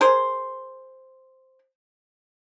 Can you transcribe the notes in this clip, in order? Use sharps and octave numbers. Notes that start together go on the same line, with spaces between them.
G#4 A#4 C5